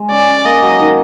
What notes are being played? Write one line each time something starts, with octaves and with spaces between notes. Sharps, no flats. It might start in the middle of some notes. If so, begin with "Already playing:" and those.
Already playing: G#3
C#4 D5
C#4
A#3 D#5
F#3
D#3